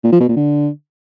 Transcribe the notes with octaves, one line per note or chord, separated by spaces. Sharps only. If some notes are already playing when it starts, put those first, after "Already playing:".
A#2
F3
B2
A#2
D3